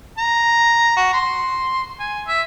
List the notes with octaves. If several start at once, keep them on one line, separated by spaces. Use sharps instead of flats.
A#5
F#4
C6
G#5
E5